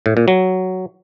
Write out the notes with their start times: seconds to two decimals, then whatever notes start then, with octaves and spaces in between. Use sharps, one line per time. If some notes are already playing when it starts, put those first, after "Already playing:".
0.06 A2
0.17 A#2
0.28 F#3